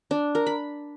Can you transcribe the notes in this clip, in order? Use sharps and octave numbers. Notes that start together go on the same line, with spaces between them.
D4
A#4
B5